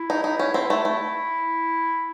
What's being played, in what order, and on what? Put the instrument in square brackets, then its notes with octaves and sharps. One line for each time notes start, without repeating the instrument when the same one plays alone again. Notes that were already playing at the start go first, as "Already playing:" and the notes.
Already playing: [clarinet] E4
[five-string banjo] D#4
D#4
C#4
C4
A3
A3